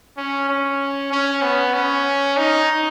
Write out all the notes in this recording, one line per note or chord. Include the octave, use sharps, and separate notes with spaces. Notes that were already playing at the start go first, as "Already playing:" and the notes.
C#4
C#4
C#4
B3
C#4
D#4